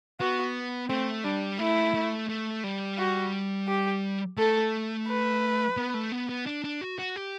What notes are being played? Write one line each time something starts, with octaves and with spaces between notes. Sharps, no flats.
B3 F#4
A3 C4
G3 D4
A3 E4
A3
A3
G3
F#4
G4
A3 A4
B4
B3
A3
B3
B3
D4
D4
F#4
F#4
G4